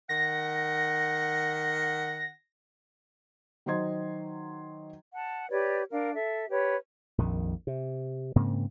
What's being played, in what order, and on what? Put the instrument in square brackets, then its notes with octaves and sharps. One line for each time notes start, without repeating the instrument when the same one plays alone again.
[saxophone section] D#3 F#5 [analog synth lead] A#6
[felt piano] D#3 F#3 C5 D#5 C6 G#6
[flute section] F#5 A5
G4 B4 C#5 D5
D4 A#4 F5
A4 E5
G4 B4 C#5
[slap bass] A#1 F2 D#3
C3
G#2 C#3 A#3 C4